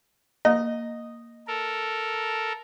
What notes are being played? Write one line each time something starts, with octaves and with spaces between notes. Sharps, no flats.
A#3 D#5 A#5
A4 A#4